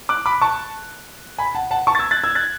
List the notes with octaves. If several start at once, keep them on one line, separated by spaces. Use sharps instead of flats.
D6 F#6
B5 D6
A5 C#6
G#5 B5
F#5 A5
F#5 A5
A5 C#6
A6
E6 G#6
F#6 A6
E6 G#6
F#6 A6